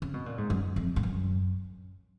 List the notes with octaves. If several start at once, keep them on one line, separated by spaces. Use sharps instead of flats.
C#3
B2
A#2
G#2
F#2
F2
G#2
F#2